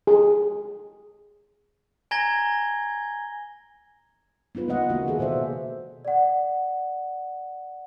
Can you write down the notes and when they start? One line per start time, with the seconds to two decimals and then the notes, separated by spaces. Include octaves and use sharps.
0.07 G#4
2.11 G#5 A#5 G#6 A#6 G7
4.55 B3 D#4 F4 B4
4.68 C#3 G#3 A#3 D#4 D#5 F#5
4.89 E3 A#3 E4 F#4
5.06 D#3 F#4 G#4 A4
5.19 B2 C5 D5 E5
6.05 D5 F#5